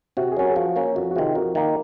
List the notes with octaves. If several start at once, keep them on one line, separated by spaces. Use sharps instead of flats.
C3 F#4
G#4
F#3 C#4 F#4 A#4
G#4
F3 F#4
A#3 C#4
F2 F#4
F#4
C3 D#3 F4 G#4
F2 F#4 A#4
D#3 A#3